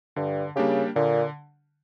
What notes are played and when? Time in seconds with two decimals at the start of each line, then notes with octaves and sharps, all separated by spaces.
0.16 G2 D3
0.56 C#3 G3 A#3 D4 G4
0.96 A#2 D3